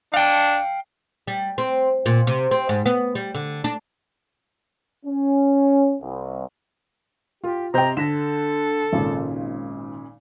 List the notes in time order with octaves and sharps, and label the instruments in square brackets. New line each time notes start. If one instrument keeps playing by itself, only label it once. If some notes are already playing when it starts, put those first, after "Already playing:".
[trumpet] D4 [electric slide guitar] F5 G5
[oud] G3
C4
A#2
C3
C4
G#2
B3
G3
D3
D4
[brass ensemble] C#4
C2
[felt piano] F4 [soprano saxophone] G4
[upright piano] C3 D#5 G6 [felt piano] C5 G5 [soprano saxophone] A#5
[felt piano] D3 [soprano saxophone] A4 [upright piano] A#6 B6 E7
[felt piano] G#1 [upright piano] A#2 C#3